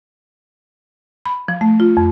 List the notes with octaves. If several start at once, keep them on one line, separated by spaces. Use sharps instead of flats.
B5
F3
A3
F4
F2